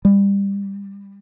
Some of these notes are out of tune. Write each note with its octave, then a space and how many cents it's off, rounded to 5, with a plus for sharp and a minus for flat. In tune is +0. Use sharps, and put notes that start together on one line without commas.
G3 +25